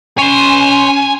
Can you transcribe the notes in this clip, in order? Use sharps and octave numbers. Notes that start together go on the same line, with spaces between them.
C#4 C#5 G#5 C6